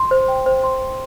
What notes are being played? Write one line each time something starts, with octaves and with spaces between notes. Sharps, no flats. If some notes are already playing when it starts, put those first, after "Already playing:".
Already playing: C6
C5
G5
C5
C6
C5